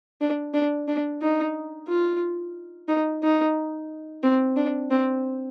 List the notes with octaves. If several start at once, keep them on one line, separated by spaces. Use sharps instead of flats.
D4
D4
D4
D#4
F4
D#4
D#4
C4
D4
C4